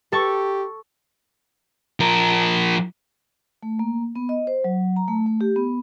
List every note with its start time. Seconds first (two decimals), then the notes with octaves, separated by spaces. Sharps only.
0.12 G4 A4 C#6
2.00 F3 A#4
3.63 A3
3.79 A#3
4.15 B3
4.29 D#5
4.47 C5
4.64 F#3
4.96 A#5
5.08 A3
5.26 A3
5.41 G4
5.56 B3